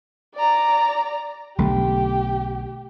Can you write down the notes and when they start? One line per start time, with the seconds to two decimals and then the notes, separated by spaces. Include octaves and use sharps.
0.35 D5 A#5
1.58 B1 D3 A3 G4